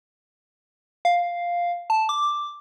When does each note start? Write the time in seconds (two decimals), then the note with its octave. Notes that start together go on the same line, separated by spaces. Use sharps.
1.05 F5
1.90 A5
2.09 D6